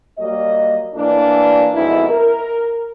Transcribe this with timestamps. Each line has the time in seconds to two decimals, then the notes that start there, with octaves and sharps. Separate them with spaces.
0.19 F#3 G3 A#3 D#5
0.96 A2 E3 A#3 D4
1.74 F2 G#2 B2 E4
2.10 A#4